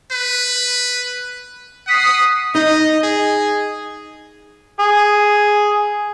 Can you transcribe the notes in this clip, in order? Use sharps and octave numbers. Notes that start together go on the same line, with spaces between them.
B4
F#5 D#6 B6 C7
D#4 D#5
G#4
G#4